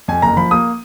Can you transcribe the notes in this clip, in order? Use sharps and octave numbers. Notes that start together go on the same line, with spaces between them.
F2 G#5
F#1 A#5
F3 B5
A#3 D#6